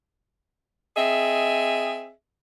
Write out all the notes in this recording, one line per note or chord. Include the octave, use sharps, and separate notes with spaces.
C4 G#4 D#5 E5